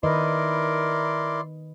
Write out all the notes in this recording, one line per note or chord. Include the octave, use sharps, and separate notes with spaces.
D#3 E4 A#4 B4 D5 D#5 C6